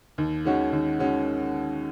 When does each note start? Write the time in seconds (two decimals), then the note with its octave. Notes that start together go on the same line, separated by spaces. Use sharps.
0.18 D#2
0.45 D#3 G#3 C#4 F#4
0.73 D#2
0.99 D#3 G#3 C#4 F#4